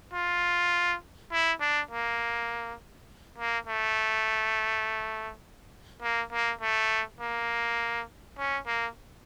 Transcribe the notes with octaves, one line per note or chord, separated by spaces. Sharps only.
F4
E4
D4
A#3
A#3
A3
A#3
A#3
A3
A#3
C#4
A#3